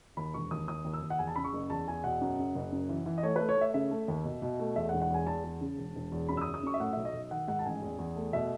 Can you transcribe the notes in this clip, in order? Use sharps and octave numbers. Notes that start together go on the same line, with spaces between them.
D#2 B5
E1 C#6
D#2 D#6
D#2 D#6
D#2
E6
D#2
F#5
E2 G#5
A5
C#3 B5
C#6
F#1
E2 A5
E2 G#5
B2 F#5
F#2
C#3
F#1
F#2
E3
E3
D#5
A3 C#5
A3 B4
C#5
A3 E5
C#3 E5
A3
D#2
B2
B2
A3
E2 E5
E1 F#5
F#5
E2 G#5
E2 A5
E2
C#3
E1
E1
E2
F#2 B5
E6
D#6
C#3
D#6
F#2 C#6
E5
A2 F#5
B1 E5
D#5
B1
D#3 F#5
G#2 F#5
A5
A1 G#5
E2
E2
A3
B2 E5